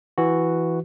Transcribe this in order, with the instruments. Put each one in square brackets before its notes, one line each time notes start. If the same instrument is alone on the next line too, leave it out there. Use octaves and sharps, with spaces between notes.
[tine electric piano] E3 F#4